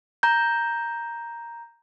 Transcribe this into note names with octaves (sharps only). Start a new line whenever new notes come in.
A#5 G6